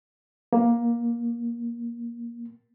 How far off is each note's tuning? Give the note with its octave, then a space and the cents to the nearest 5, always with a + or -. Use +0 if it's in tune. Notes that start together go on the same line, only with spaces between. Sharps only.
A#3 +15